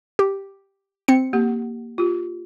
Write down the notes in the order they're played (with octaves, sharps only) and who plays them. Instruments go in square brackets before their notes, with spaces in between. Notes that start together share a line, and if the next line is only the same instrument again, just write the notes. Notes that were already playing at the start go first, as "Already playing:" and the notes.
[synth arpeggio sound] G4
C4 C#7
[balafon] A#3 G4 F#5
F4 G4